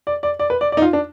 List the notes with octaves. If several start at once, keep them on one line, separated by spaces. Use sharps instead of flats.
D5
D5
D5
B4
D5
D5
D#4
F4
D4